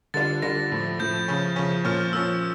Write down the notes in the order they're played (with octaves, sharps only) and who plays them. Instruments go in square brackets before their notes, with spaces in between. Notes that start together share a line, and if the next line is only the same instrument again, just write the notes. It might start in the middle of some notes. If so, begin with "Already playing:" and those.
[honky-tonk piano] D3 G3 D4 F4 [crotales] A6
[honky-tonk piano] D3 G3 D4 F4 [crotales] A#6
[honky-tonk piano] A2 F3 A3
[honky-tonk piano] A2 F3 A3 [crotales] G6
[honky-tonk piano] C#3 F3 C#4
C#3 F3 C#4
[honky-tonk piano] A#2 F3 C#4 [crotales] F6
[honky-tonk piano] A#2 F3 C#4 [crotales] E6